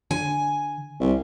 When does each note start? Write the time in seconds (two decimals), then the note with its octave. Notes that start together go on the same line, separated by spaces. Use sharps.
0.11 D3 G#5
1.00 C2